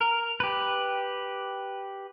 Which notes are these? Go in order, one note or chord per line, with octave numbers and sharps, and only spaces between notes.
A#4
G4 B4